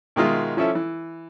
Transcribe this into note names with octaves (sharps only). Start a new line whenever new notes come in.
B2 D#3 G#3 F4 E5
F3 C#4 E4 A4 E5
E3